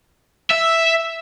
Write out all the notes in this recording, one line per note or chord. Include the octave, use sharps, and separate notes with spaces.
E5